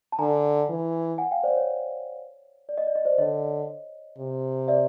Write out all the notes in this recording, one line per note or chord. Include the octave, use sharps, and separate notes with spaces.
A5
D3 G#5 A#5
E3
F#5 G#5
F5 G5
C5 D5
C#5
D5
D#5
D5
D#5
C5 D5
D3 C#5 D#5
C3
D5 E5